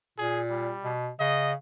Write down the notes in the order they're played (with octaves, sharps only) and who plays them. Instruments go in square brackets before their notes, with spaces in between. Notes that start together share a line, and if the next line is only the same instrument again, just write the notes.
[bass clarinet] A#2 [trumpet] G#4
[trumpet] G3
[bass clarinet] B2
[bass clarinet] C#3 [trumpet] D#5